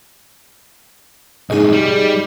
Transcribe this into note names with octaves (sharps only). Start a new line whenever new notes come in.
C2 G#2 D#4 G#4 D#5
G3